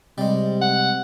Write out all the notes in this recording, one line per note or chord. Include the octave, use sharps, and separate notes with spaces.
C3 G3 G#3
F#5